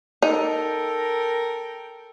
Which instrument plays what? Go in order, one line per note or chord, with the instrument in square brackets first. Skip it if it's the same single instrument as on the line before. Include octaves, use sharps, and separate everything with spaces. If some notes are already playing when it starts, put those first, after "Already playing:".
[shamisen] D#4 [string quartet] A4 A#4 G5